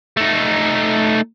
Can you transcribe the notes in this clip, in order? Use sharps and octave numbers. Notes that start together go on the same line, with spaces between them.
A3 D#4